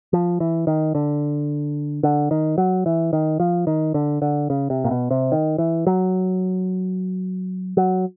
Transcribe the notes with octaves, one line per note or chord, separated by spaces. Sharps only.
F3
E3
D#3
D3
D3
D#3
F#3
E3
D#3
F3
D#3
D3
D3
C#3
C3
A#2
B2
C3
D#3
E3
F#3
F#3